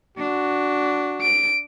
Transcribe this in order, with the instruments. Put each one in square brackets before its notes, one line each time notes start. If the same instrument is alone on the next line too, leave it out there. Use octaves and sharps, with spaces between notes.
[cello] D4 [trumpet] F#4
[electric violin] D7